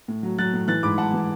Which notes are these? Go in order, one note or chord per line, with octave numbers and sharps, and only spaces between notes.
A2
F#3
F#3 F#6 A6
A2
E3 F#6 A6
G#2 B5 D6
G#2 F#5 A5
E3